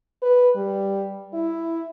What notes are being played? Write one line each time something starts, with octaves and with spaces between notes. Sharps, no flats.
B4
G3
E4